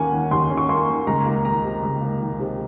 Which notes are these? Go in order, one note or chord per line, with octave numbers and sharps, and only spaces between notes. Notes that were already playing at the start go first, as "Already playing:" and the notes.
Already playing: D#2 A#3 C#4 F#5 G#5
D#3
D#2 C6
C#4
C#6
A#3 C6
D#3
C#2 A#5
A#3
D#3 A#5
C3
C#2
A#3
D#3
C3